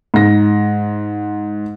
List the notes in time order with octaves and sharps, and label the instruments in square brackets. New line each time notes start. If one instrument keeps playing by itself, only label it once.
[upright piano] G#2 A#6